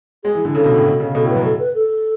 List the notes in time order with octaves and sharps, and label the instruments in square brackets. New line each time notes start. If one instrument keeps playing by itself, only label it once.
[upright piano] G#3 [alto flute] G#4
[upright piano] E3
D3
[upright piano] C#3 [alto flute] A4
[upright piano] B2
A2
B2
C#3
[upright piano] B2 [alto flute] A4
[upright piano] A2
[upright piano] F#2 [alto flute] B4
[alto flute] A4
B4
A4